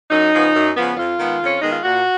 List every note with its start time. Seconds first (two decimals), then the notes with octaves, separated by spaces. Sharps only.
0.11 F#2 D#4
0.32 C#3 F3 B3
0.54 F#2
0.76 C#3 F3 B3
0.97 F2 F4
1.19 D#3 G#3 B3
1.40 F2
1.46 C#4
1.59 D#3 G#3 B3 D#4
1.71 F4
1.83 A#2 F#4